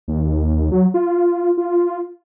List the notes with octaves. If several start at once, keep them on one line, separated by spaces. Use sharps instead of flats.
D#2
F#3
F4
F4